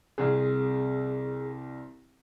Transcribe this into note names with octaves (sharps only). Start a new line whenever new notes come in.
C2 C4 G#4